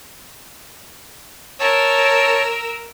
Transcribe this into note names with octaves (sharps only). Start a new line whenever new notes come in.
A#4 C#5 A5 E6